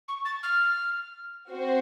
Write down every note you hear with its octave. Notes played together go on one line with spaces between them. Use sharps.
C#6
A6
F6
C4 F#4 C5